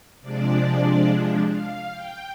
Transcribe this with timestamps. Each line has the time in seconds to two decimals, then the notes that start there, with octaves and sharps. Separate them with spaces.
0.21 C3 F3 G#3 D4 D5
1.49 F5
1.92 G5